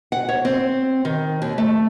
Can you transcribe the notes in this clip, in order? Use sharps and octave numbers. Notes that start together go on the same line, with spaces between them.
F#5
C#5
C4
D#3
D#2
A3